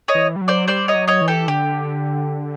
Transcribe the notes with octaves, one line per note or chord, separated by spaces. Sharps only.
C#5 D#5
E3
G3
F#3
C5 D5
G3 C5 D5
C#5 D#5
F#3
C#5 D#5
E3
G4 A4
D3 G4